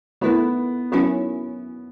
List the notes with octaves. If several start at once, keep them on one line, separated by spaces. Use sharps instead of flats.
D#3 A3 B3 E4 B4
D#3 F#3 B3 C#4 E4